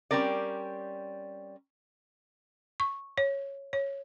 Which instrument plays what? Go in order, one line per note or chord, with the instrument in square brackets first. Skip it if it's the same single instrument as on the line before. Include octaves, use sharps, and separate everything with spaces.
[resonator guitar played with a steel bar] G3 C4 C#4 A#4 D5
[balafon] C#6
C#5
C#5